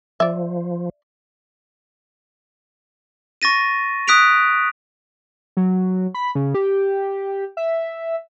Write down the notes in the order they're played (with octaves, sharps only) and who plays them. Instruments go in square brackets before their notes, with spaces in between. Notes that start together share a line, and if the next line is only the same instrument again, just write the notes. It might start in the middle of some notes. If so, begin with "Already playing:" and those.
[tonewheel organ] F3 [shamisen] D5 E5
[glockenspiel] C#6 A6 A#6 D#7
D#6 F#6 B6 D7 F7
[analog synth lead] F#3
B5
C#3
G4
E5